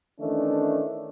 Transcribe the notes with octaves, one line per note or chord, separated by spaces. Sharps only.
D#3 E3 A3 C#4 D4